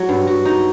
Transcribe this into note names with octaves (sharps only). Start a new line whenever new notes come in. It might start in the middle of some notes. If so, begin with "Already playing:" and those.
Already playing: F#3
G2
F#4
D#4